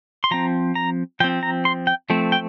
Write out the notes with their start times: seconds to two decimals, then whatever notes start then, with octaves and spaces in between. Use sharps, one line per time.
0.24 C6
0.31 F3 C4 A#5
0.75 A#5
1.20 F3 G5
1.24 C4
1.43 A#5
1.65 C6
1.87 G5
2.10 F3 A3 C4
2.32 G5